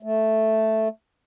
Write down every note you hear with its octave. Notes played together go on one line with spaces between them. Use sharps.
A3